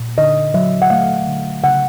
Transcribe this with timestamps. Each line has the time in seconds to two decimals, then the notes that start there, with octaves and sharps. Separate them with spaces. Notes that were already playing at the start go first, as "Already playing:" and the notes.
Already playing: A#2
0.18 D3 D#5
0.54 F#3 E5
0.82 F#5
0.90 A3 F5
1.28 D3
1.63 C#3 F#5